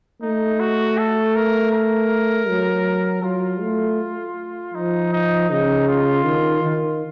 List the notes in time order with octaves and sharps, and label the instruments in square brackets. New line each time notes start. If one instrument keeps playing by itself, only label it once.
[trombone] A3 [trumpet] D#4
[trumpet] F#4
A4
A#4
A#4
[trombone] F#3
[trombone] F#3 [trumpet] F4
[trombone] A3
[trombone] F3 [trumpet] D#4
[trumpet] D#4
[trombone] C#3 [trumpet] D#4
[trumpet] F4
[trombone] D#3
D#3